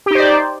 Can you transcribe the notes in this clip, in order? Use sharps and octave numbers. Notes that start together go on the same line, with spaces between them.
D#4 G4 C5 D5